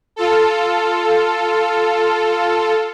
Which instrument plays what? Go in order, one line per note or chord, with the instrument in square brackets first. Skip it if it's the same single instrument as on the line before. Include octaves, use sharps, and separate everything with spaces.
[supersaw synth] F4 A4